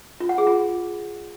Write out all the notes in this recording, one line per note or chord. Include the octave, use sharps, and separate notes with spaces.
F4
F#5
G#4
F4